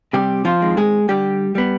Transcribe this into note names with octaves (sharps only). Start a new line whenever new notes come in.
C3 G3 G4
F3 F4
D#3 G#3 C4
G#3 G#4
D3 G3 G4
G3 B3